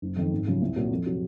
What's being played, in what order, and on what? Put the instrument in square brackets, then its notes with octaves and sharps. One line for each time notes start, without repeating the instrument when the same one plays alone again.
[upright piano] F#1
F2 D#3
G#1
F#2 C#3 F3
C2
A#2 F#3 A#3
F2
C3 F#3